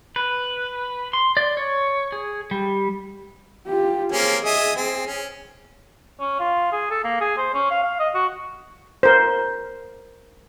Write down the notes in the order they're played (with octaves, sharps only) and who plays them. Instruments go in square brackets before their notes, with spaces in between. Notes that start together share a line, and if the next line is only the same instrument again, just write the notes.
[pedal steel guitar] B4
C6
D5
C#5
G#4
G3
[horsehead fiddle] F4 G4
[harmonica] A#3 C4 C#4 [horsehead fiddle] G#4
[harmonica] D#5 E5 G#5
C4
C#4
[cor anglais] C#4
F4
G#4
A4
A#3
G#4
C5
C#4
F5
F5
D#5
F#4
[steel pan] A#4 C5